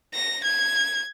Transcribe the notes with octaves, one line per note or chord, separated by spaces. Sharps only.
A#6
G#6